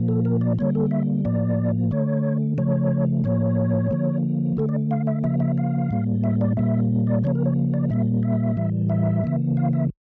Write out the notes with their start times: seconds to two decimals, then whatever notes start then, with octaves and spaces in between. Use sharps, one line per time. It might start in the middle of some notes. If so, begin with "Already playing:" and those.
Already playing: A#2 F3 A#3
0.08 A4
0.25 A#4
0.41 D5
0.59 D3 G3 A#3 C#5
0.75 A4
0.91 E5
1.25 A2 F3 A#3 D5
1.91 D3 A3 C#5
2.58 C#3 F3 A3 C#5
3.24 A2 F3 A#3 C#5
3.91 D3 F3 A#3
4.57 D3 A3 A4
4.69 D5
4.91 F5
5.07 E5
5.24 C#3 F3 A#3 E5
5.40 E5
5.58 F5
5.91 A2 G3 A#3
6.24 E5
6.41 D5
6.57 A#2 G3 A#3 E5
7.07 D5
7.24 C#3 F3 A#3 C#5
7.35 A#4
7.46 C#5
7.74 D5
7.90 A#2 G3 A#3 E5
8.23 E5
8.57 A2 E3 G3
8.89 E5
9.24 C#3 E3 A#3
9.57 F5
9.73 E5